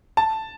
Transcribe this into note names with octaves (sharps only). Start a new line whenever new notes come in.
A5